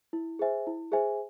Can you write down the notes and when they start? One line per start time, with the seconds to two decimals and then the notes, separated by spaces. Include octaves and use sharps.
0.13 E4
0.39 G#4 C5 E5 G#5
0.67 E4
0.92 G#4 C5 E5 G#5